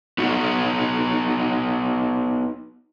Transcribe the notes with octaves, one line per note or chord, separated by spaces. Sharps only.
B3 D#4 F#4